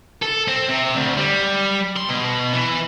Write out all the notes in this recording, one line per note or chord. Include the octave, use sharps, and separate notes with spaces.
A4
C4
C3
D2
G3
C6
B2
E3